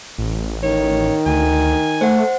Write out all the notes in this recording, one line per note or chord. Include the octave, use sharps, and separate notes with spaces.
A1
D#3 C#5
D2 G#5
A3 C5 F#5